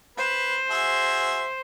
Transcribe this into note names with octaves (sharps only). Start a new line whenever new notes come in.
B4 C5
F#4 G#4 E5